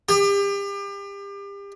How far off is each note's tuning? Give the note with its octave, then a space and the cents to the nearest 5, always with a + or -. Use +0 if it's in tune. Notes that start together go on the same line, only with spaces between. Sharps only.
G4 +35